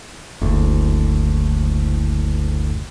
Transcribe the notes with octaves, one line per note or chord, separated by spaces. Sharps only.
F#1 D2